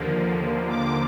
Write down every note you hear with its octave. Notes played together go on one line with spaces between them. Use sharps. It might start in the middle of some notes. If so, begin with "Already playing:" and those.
Already playing: D#2 D3 F3 A#3
D6